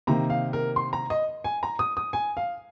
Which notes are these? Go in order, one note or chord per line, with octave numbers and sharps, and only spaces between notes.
C3 D#3 A#3 A#5
F5
A#4
C6
A#5
D#5
G#5
A#5
D#6
D#6
G#5
F5